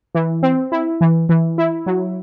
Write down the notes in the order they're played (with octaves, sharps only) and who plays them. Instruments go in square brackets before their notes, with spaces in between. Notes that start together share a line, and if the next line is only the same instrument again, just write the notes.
[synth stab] E3
C4
E4
E3
E3
E4
F#3